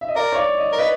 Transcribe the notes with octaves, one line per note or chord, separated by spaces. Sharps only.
E5
D#5
A#4 D5
C#5
D5
D#5
A#4
B4 D#5